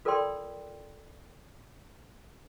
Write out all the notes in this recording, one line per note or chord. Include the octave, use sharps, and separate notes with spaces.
F4 A4 A#4 D5 G5 C6